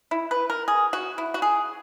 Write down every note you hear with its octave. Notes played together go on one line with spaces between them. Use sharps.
E4
B4
A#4
G#4
F#4
E4
F#4
G#4